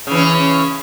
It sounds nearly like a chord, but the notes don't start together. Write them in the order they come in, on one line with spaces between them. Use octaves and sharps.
C#3 E3 C#4